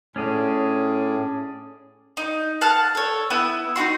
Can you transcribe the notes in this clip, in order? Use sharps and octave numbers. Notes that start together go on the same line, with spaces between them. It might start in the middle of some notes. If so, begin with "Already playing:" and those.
A2 C#4 D4 G#4
D#4
F5 F#5 A5 F6
A4 C#5
B3 E4 E5 D#6
D#4 E4 F#4 C6